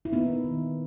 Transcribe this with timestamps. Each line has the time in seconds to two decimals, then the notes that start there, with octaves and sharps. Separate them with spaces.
0.05 E4
0.12 A#3 B3 D#4
0.44 D#3